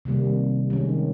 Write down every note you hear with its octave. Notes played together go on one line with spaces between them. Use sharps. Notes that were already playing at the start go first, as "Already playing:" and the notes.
C3 D#3 G3 A#3
D#3 G#3 C#4